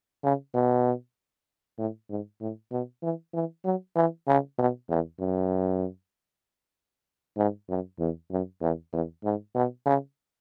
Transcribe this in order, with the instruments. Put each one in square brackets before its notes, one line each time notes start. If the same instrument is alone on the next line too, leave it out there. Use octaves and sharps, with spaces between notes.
[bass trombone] C#3
B2
A2
G#2
A2
B2
E3
E3
F#3
E3
C#3
B2
E2
F#2
G#2
F#2
E2
F#2
E2
E2
G#2
B2
C#3